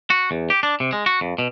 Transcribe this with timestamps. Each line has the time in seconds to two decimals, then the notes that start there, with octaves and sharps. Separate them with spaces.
0.10 F#4
0.31 E2
0.50 G4
0.63 D4
0.80 C3
0.93 G#3
1.06 F#4
1.21 F2
1.38 B2